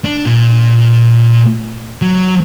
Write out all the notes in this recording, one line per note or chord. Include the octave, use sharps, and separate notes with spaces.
D4
A#2
F#3